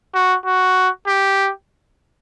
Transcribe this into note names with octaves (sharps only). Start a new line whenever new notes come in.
F#4
F#4
G4